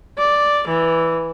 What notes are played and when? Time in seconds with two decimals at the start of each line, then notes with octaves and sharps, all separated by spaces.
0.18 D5
0.68 E3